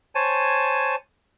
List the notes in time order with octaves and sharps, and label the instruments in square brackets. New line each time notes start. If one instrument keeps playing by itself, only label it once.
[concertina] C5 C#5 G#5 A5